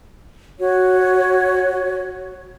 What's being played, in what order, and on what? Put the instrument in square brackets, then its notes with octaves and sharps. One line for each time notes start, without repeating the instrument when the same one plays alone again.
[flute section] F#4 C#5